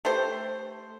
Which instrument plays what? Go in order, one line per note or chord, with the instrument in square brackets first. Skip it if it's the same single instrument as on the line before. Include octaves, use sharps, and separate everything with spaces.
[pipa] A3 G4 C5